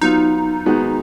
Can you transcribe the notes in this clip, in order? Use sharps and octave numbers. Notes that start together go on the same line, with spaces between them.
F#3 B3 D#4 F4
D#3 G#3 B3 F#4